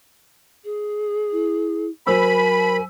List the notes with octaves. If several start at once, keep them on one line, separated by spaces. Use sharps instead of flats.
G#4
E4
F#3 A#4 C5 G#5 B5 E6